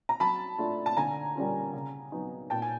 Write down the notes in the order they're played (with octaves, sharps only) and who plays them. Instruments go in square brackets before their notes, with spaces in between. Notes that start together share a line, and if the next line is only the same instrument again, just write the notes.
[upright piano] A#5
F#3 A5 B5
A3 D4 F4
A5
D3 G#5 A#5
G3 A#3 C#4 F4
C#3
F#3 B3 D#4
A#2 G5 A5
G#5